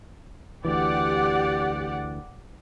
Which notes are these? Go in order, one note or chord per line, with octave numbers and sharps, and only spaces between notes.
D2 E3 G4 D5 F#5